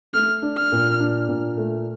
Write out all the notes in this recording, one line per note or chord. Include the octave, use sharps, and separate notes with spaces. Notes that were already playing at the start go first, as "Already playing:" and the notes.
A3 F6
D4
F6
A#2
D4
A#2
A3